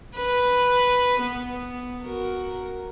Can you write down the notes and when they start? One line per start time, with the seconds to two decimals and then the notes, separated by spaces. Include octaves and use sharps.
0.16 B4
1.22 B3
2.04 F#4 A#4